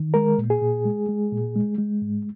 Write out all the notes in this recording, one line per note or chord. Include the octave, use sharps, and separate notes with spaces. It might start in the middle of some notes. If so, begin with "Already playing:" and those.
Already playing: D#3
G#3 A#4
A#2
G#4
A#2
G#3
G#3
A#2
G#3
G#3
G#2